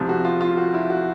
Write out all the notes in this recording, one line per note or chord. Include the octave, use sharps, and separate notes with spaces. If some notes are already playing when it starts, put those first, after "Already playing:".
Already playing: C2 C3 F3
F#4
F4
F4
F#4
E4
F#4